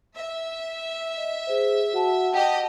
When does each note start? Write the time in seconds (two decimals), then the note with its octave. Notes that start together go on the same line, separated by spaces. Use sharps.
0.15 E5
1.17 D#5
1.47 G#4 C5
1.93 F#4 F#5 A5
2.34 G4 D#5 F#5 A5